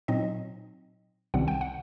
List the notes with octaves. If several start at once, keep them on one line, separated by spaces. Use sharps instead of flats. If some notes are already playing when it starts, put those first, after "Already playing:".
A#2 F#3 C4 D#4 D#5
C2 C3 D#3 G3 C4 F#5
G5
F#5